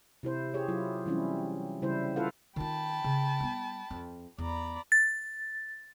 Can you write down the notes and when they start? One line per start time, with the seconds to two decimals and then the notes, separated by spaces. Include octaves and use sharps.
0.23 C3 E4 C5
0.54 G4 G#4 C#5
0.68 F#3 E4 F4
1.06 E3 G3 C4 C#4 E4
1.82 C#3 G3 E4 C5
2.16 E4 F4 A4 B4 F5 F#5
2.56 D#3 F4 G5 A5 B5
3.04 C#3
3.40 G3 B3
3.91 F2
4.38 E2 D5 A#5 B5
4.92 A6